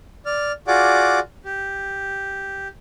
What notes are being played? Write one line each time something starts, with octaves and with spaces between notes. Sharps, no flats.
D5 F6
F4 F#4 G#4 D5 F#5 D6
G4